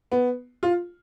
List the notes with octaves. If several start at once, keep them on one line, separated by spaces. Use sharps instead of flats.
B3
F4